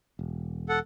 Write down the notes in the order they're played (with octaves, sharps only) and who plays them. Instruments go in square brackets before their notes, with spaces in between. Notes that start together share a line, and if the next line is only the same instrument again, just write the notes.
[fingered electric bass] E1
[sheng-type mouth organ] A4 F#5